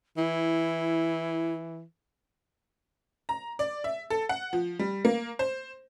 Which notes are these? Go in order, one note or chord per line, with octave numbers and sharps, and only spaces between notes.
E3 E4
A#5
D5
E5
A4
F#5
F3
G3
A#3
C5